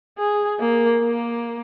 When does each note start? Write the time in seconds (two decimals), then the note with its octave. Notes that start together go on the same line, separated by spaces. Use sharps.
0.18 G#4
0.60 A#3
1.02 A#3